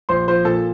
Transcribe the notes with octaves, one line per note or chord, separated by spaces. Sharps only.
A#1 C5 C6
F3 C5 C6
A#2 A4 A5